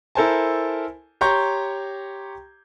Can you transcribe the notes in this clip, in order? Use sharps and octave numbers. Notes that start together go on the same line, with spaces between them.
E4 A4 A#4 C5 G#5 A5
G4 C#5 A#5 C6 C#6 G6